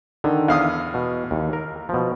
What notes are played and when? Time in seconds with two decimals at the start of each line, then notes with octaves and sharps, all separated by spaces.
0.24 D3 D#3
0.48 E2 F5 D#6
0.94 B2
1.31 D#2
1.53 A#4
1.89 B2 F3